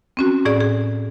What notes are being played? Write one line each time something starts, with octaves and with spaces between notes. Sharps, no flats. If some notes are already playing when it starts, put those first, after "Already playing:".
C4 C#4 F#4
A2 G#4 D5
G#4